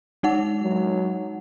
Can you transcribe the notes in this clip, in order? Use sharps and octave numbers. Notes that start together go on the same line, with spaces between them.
G#3 D#4 F#5
F#3